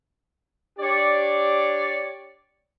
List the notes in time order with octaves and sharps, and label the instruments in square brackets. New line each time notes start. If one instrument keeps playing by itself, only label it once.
[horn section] D4 G4 C#5 D5